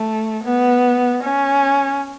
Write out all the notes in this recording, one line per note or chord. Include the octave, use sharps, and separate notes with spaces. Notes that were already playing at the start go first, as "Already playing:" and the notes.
Already playing: A3
B3
C#4